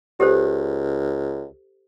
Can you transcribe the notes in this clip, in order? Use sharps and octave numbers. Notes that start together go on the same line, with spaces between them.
C#2 G4 A4 C5